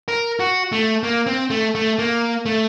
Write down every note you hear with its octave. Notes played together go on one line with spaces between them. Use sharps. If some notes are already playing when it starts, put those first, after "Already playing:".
A#4
F#4
A3
A#3
C4
A3
A3
A#3
A3